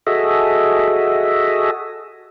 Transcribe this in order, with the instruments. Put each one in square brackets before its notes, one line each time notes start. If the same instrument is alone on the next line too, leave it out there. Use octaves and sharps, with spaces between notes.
[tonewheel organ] F#4 G#4 A4 D#5 E5